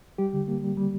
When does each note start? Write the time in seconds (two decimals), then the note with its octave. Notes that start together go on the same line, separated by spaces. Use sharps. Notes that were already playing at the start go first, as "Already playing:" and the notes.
0.18 G3 G4
0.33 D3
0.48 A#3
0.63 G3
0.77 G3